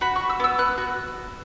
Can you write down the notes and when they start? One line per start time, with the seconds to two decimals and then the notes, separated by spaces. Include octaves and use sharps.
0.01 F#4 B5
0.16 F#4 C#6
0.30 E6
0.40 B3 E6
0.58 B3 F#6
0.78 F#4